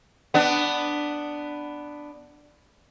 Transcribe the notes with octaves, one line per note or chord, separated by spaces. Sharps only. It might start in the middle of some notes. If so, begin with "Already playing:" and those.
B3 D4